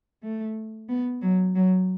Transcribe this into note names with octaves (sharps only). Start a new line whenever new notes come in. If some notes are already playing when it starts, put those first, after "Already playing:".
A3
B3
F#3
F#3